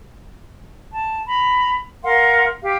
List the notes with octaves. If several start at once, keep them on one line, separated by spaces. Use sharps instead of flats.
A5
A#5 B5
A#4 F5 F#5 C6
G4 F5